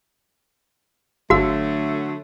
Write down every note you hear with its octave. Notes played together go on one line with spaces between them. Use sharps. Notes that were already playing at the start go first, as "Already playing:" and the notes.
G1 D3 F#3 A3 F#4 F5 E6